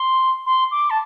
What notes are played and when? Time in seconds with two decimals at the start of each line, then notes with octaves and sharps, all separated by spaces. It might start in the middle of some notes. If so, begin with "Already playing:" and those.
Already playing: C6
0.46 C6
0.71 D6
0.90 A5